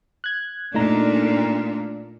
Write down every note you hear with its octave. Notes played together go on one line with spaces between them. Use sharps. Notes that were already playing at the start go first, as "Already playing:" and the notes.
F#6 G#6
A#2 A3 D4 D#4 A#5